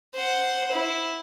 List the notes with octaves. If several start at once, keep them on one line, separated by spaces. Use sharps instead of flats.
C5 F#5
E4